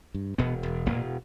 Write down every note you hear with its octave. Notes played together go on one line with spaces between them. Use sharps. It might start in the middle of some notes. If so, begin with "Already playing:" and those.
G2
E1 B2 B3
E1
E1 A#2 A#3